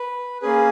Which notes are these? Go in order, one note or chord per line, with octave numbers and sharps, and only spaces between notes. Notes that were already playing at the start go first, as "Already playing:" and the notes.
Already playing: B4
A#3 C#4 G#4 B4